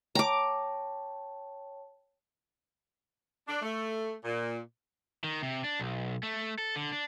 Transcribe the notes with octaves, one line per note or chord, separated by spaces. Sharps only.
C#5 G5 A5 A#5 D6
D4
A3
A#2
D#3
C3
D4
B1
A3
A4
D3
D4